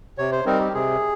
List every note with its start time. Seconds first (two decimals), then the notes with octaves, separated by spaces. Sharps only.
0.18 C3 C#5
0.32 C5
0.46 G3 C4 D#4 A#4
0.60 G4
0.74 C3 G#4